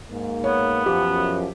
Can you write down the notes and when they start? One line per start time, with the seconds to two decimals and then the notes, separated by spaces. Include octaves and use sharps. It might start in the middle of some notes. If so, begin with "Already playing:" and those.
0.10 G#2 A#3
0.44 B3 C#5
0.86 F#2 F3 G4